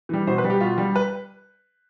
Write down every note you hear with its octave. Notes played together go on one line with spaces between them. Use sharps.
E3 G3
B2 C5
B4
G3
G4
B2 F4
G3
B4